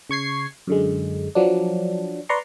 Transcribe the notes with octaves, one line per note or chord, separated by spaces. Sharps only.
C#3 C#6 G#6 C7
F#2 D3 G#3
F3 F#3 D4
B4 D5 A#5 C6 C#6